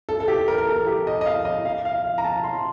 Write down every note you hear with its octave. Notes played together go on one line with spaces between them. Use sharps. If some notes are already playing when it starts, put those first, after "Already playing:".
A4
A4
G4
A#4
A#4
A4
G4
D#5
D#5
F5
D#5
F5
F5
F5
A#5
A5
C6